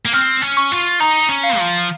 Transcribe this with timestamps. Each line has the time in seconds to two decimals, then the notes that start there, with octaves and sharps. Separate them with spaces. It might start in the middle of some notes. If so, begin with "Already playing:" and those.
0.05 A#3
0.13 C4 F6
0.42 C#4
0.57 C#6
0.72 F4
1.00 D#4 A#5
1.29 C#4
1.44 F5
1.58 F3